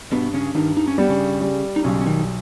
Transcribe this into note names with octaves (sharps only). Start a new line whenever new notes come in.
G2 B2 B3
C#3 C#4
G2 D#3 D#4
D#4
C#4
G3 B3
C#3 C#4
G3
D#4
B1 C#3 C#4
C#4
D#3 D#4